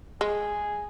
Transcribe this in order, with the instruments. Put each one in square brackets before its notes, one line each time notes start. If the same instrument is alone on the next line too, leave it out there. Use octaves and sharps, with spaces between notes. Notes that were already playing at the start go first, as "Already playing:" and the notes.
[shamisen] G#3 [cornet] G#4